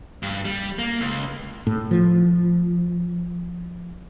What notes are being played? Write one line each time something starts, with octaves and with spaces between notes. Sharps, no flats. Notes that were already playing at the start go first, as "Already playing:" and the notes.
G2
G3
A#3
C#2
A2
F3